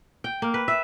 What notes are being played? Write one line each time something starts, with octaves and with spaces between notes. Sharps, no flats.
G5
A#3
B4
E5